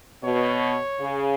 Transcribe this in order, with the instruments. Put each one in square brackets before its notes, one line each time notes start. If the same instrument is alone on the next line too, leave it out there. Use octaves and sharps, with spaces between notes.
[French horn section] B2 [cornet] C#5
[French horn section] C#3